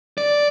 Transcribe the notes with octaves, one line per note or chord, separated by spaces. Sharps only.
D5